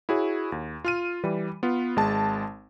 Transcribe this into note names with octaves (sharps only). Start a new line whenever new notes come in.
E4 F#4 G#4 C#5
D#2
F4 F6 D#7
E3 G3
B3 F4 B4
G#1 G#3 A5